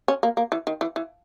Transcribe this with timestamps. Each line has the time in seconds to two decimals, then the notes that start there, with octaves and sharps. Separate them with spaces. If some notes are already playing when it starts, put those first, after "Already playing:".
0.08 C#4
0.23 A#3
0.37 A#3
0.52 E3
0.67 D#3
0.81 E3
0.96 E3